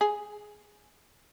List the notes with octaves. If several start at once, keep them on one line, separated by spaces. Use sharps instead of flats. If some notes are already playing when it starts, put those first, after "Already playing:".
G#4